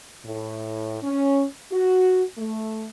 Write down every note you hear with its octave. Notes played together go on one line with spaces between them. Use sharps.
A2
C#4
F#4
A3